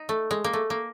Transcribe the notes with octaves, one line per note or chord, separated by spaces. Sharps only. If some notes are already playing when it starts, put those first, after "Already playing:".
Already playing: D#4
A3
G#3
A#3
A3
A#3